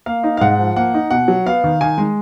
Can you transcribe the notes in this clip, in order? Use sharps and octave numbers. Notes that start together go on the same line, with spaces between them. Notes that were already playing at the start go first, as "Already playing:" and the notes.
A#3 F5
D#4
F5
G#2 F#5
F3
A#3 F#5
D#4
B2 F#5
F#3
B3 F5
D#3
D#3 G#5
G#3